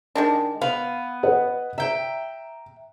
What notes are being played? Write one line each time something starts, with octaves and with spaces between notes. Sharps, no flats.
D#3 G#3 D4
B3 F5
B4 D#5 F#5
E5 G5 A#5